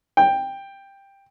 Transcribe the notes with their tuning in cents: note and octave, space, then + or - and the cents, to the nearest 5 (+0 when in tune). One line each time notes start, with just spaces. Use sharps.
G5 +10